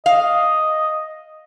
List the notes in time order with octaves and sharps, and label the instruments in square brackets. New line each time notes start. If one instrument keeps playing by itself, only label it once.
[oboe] D#5 [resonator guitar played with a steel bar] F5